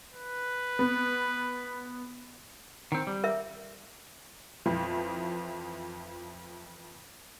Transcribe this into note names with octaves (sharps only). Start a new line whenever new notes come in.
B4
B3
D#3 C4
G3
A#4 E5
F2 E3 F3